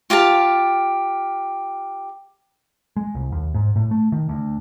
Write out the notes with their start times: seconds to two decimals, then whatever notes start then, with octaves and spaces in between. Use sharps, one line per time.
0.10 F4 G4 F5 A5
2.96 G#3
3.15 C2
3.32 D#2
3.54 G#2
3.76 A2
3.91 A3
4.12 D#3
4.29 D2